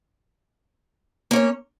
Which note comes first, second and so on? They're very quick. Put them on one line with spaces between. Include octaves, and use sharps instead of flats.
A#3 C#4 C#5